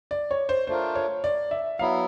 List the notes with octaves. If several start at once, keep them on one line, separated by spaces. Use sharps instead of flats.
D5
C#5
C5
A3 D4 F4 A#4 C5
C#5
D5
E5
F#3 B3 E4 F5